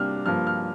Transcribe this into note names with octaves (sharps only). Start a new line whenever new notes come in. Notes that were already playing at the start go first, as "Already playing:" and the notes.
Already playing: C3 G3 A#3 D4 F6
G2 F3 A#3 F6
F6